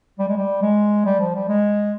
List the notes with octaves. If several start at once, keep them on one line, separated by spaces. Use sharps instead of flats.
G3
G#3
G3
G#3
G3
F3
G3
G#3